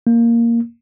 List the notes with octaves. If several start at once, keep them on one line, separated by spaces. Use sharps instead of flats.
A#3